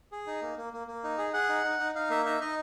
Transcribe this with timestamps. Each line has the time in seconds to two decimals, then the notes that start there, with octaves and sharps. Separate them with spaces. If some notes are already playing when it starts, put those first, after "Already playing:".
0.12 G#4
0.27 D#4
0.42 A#3
0.57 A#3
0.73 A#3
0.87 A#3
1.04 D#4
1.18 G#4
1.33 G#4 F#5
1.49 D#4
1.64 D#4
1.79 D#4
1.95 D#4 F5
2.10 A#3 E5
2.25 D#4 E5
2.41 D#4 D#5